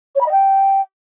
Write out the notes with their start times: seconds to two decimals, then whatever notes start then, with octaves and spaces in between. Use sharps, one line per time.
0.15 C#5
0.20 B5
0.26 D#5
0.31 G5